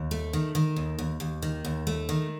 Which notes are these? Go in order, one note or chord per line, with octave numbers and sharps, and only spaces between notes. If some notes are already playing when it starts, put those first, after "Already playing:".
Already playing: D#2
A3
D#3
D#3
D#2
D#2
D#2
D#3
D#2
A3
D#3